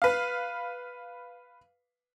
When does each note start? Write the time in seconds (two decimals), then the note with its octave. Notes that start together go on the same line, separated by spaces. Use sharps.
0.02 B4 F5